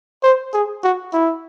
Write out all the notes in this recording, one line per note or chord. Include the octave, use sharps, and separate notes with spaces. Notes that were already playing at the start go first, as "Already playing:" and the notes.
C5
G#4
F#4
E4